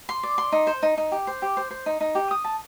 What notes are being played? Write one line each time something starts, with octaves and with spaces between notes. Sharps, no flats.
C6
D5
C6
D#4
C5
D#4
D#4
G4
C5
G4
C5
C5
D#4
D#4
G4
D#6
A5